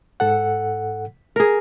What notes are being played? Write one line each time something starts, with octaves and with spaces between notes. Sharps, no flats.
G#2 A4 F#5
G#4 A#4